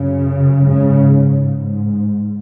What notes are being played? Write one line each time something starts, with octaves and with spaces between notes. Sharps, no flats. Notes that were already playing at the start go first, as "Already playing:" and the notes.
Already playing: F#2 C#3
G#2 C#3
G#2